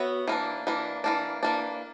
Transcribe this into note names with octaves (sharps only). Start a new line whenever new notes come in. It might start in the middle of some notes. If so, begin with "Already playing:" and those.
Already playing: B3 F#4 C#5 E5
E3 A#3 D4
E3 A#3 D4
E3 A#3 D4
E3 A#3 D4